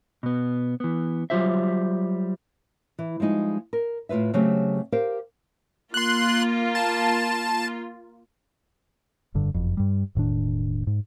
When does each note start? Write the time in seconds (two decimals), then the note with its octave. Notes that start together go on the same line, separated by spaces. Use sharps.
0.23 B2 B3
0.80 E3 B3
1.30 F#3 G3 F4 C5 E5
2.99 E3
3.20 F3 G3 G#3 D#4
3.73 A#4
4.09 A2 F#3 F4 B4 E5
4.34 C#3 F#3 A3 C4 F#4 G4
4.92 G4 A#4 C5 F5
5.94 A#3 F4 C6 F#6
6.75 A5
9.34 F1 G2 D3
9.54 F#1 F2
9.77 G2 G3
10.15 E1 A2 D#3 D4
10.87 G#2